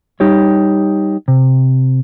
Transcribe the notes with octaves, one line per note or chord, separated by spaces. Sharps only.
G3 D#4 G4 C#5
C3